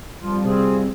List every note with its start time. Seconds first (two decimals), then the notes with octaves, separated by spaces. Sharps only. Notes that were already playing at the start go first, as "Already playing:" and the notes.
0.21 F2 F3 G3 F4
0.45 C3 C4 F4 G#4